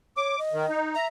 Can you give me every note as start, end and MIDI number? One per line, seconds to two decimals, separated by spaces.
0.17 0.38 73
0.17 0.39 86
0.39 0.78 75
0.52 0.66 51
0.69 0.95 63
0.95 1.08 76
0.95 1.07 82